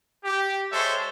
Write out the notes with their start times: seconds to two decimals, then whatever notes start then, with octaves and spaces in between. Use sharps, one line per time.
0.24 G4
0.72 G#3 A4 C5 C#5 E5